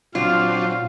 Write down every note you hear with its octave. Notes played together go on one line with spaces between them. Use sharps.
A#2 F#3 C4 D4 F4 F5